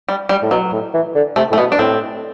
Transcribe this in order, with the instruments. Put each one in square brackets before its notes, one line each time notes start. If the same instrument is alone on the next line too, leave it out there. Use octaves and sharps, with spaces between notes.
[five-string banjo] G3
G3
[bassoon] A2
[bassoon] B2 [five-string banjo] F#3
[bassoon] A2
E3
D3
[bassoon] C3 [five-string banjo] A3
[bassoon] A2 [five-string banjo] A3
[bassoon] B2 [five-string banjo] B3
[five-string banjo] D4
[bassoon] A2 [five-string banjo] C4